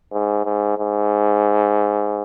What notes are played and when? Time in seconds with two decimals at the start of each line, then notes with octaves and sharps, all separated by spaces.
0.12 G#2
0.45 G#2
0.77 G#2